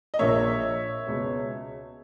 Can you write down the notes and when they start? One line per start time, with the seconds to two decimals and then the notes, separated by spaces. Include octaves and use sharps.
0.14 D#5
0.19 A#1 A#2 A#3 C#5 E5
1.06 C#2 B2 G#3 B3